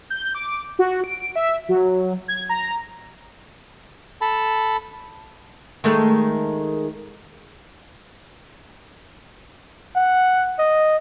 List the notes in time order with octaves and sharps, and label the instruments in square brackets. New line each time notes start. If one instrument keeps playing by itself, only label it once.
[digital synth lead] G6
D6
F#4
D7
E5
F#3
G#6
A#5
[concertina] A4 A5 B5
[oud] D#3 G#3 A3
[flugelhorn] F#5
D#5